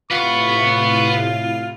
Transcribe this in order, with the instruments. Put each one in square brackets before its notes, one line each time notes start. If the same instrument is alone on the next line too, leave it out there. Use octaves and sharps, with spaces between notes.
[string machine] A2 C3 E4 [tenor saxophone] F4 [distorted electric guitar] B4 F#5 [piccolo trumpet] C#6